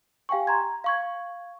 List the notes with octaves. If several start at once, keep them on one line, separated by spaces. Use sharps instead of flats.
G4 F5 G5 G#5 C#6
A#5 C6 G#6
F5 C#6 G#6